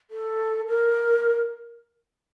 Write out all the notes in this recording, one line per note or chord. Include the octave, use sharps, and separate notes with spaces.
A4
A#4